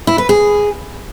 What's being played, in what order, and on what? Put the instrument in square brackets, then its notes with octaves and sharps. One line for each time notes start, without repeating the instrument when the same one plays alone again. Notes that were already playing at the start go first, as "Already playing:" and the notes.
[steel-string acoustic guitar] E4
B4
G#4